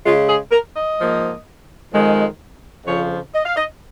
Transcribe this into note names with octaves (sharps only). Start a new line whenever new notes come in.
C#3 G#3 F4
G#4
A#4
D#5
G#2 F3 A#3
F2 D#3 G#3
F2 C#3 F3 C#5
D#5
F5
D#5